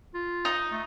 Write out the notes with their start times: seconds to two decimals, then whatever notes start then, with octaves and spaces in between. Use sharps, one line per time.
0.14 F4
0.45 D#4
0.72 A3